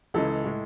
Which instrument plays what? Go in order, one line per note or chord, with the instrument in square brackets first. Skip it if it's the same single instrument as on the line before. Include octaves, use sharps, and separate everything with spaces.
[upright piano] C#2 C#3 E3 G#3 A4
A2 G#3